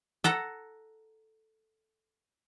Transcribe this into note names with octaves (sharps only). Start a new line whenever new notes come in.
A4 F#5 A#5